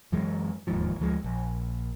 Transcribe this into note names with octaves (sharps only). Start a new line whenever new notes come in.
F#2 E3 F#3 G#3
E1 D#2 G#2 F3
D2 F3 G#3
A#1